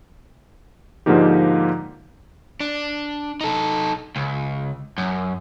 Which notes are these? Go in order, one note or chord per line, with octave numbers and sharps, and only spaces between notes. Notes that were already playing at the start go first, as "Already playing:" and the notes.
G#2 D3 F3 A#3 D#4 G4
D4
D#4 A4
C#2
F#2